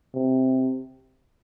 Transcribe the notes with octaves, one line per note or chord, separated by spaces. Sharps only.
C3